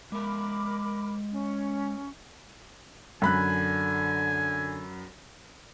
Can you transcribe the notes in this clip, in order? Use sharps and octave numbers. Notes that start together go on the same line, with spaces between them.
G#3 A#4 E5 B5 D6
C#4
F#2 D3 G#5 B5 F#6